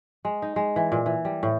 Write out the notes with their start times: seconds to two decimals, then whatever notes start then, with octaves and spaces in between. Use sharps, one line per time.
0.25 G#3
0.42 D#4
0.56 G#3
0.76 E3
0.92 A#2
1.06 E3
1.25 G3
1.43 A2